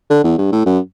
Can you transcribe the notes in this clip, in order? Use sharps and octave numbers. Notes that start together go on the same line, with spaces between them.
D3
E2
G2
A2
F#2